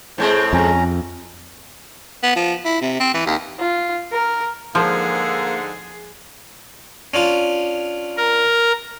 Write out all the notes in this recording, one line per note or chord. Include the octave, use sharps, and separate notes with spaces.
A2 G#3 C4 C5
F2 C#4 A#5
B3
F3
E4
C3
C4
E3
D#2
F4
A#4
G#2 D3 F3 A#3 G#4
C#4 D4 F4
A#4